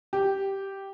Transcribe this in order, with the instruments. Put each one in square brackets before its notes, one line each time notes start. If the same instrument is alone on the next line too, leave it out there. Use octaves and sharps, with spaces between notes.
[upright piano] G4